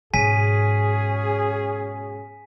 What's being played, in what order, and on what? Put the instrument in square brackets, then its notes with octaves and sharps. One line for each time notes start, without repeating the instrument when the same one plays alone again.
[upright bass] G#2 B2 [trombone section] C#4 F#4 G#4 [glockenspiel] G#5 B6 D#7